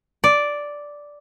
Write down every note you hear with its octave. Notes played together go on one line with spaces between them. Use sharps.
D5